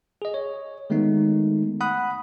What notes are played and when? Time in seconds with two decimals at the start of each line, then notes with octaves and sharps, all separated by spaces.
0.22 G#4 D#5
0.34 C#5
0.90 D#3 G#3 A3 B3 D#4
1.81 F#5 B5 D#6 F#6